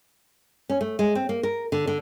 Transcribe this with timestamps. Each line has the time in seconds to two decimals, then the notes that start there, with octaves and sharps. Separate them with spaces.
0.69 C#4
0.81 A3
0.99 G#3
1.15 C4
1.29 A#3
1.43 A#4
1.72 D3
1.87 D3